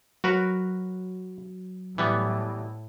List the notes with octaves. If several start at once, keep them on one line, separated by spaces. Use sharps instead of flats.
F#3 F#4 A#4 B4
A2 E3 G3 B3